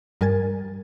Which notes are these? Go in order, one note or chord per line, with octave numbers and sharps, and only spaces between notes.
G2 G3 A#4 G#5 G#6 A6